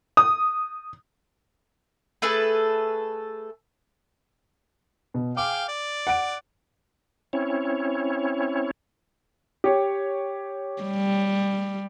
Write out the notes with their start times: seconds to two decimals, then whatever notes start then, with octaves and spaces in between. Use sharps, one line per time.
0.17 D#6
2.22 A3 G#4 A4 B4
5.14 B2
5.37 G#4 F5 G5 D6
5.68 D5
6.07 F#5 D7
7.33 C4 C#4 E4 C#5
9.64 G4 C#5
10.83 G3